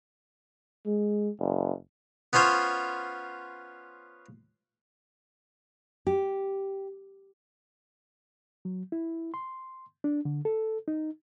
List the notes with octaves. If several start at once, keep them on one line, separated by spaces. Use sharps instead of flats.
G#3
F#1
B3 C#4 F4 C5 C#5
G4
F#3
E4
C6
D4
D3
A4
D#4